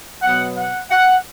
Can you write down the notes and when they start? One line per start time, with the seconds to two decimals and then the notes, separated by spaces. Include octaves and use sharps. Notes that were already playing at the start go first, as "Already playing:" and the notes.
0.22 B2 F#3 B3 F#5
0.57 F#5
0.91 F#5